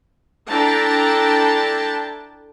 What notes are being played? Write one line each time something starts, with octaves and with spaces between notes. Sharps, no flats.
D4 E4 A4 G5 A5 A#5